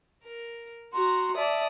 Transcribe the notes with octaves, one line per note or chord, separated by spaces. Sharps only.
A#4
F#4 A#5 C6
D5 E5 A5 D#6